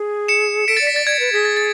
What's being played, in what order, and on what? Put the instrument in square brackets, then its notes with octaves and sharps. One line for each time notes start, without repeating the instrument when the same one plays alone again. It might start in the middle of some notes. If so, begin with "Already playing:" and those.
Already playing: [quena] G#4
[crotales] C#7 E7
[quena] A4 [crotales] B6 D7
[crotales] A6 C#7
[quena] D5
[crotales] B6
[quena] D5 [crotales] A6
[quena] D5 [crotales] G#6
[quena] B4
[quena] G#4 [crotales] B6
[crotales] A6
A6